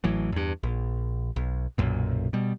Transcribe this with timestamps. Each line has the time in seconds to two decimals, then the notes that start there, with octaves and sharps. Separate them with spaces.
0.04 A1 A2 E3 F#3
0.32 E2 G2
0.63 A#1
1.36 B1
1.78 B1 F#2 A#2
2.33 B2 G3